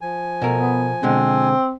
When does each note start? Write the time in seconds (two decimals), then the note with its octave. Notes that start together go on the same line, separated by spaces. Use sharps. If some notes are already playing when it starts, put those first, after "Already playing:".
0.01 F3 G#5
0.42 B2 A4 A#4
0.58 B3
1.03 B2 D3 G#3 C4